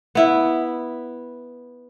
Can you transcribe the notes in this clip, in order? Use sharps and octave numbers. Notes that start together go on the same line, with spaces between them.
B3 E4